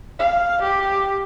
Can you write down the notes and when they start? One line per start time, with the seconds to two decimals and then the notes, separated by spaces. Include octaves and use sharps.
0.19 F5
0.63 G4